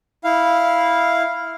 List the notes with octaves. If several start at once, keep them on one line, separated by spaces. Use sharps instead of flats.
E4 F5